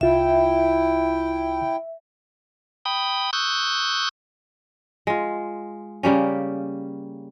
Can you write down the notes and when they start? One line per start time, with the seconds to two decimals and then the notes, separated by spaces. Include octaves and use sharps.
0.01 C2 E4 F4 E5 G5
2.85 G5 B5 D#6
3.33 C#6 D#6 E6 F#6 G6
5.07 G#3 F4
6.03 C#3 G3 A#3 C#4